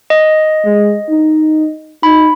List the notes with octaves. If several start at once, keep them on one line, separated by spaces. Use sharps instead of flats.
D#5
G#3
D#4
D#4 B5